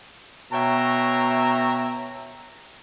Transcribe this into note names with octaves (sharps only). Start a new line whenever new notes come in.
B2 C#5 E5 G5 A#5